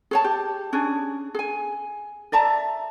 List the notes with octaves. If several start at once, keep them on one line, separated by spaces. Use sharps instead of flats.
G#4 C#5 A5
G4
C#4 D4 G#4
G#4 G#5
D5 E5 A5 A#5